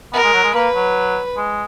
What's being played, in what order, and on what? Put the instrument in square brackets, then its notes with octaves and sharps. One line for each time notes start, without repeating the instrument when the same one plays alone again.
[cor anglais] B3 [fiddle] A#4
[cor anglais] G#3
F#3
G#3
[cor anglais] A#3 [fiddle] B4
[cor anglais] F#3
G#3